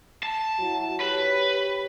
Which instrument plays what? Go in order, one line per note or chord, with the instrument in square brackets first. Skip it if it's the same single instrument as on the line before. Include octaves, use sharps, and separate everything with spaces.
[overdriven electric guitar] A5
[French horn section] F#3 E4 F#4
[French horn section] G4 C#5 [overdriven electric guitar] B4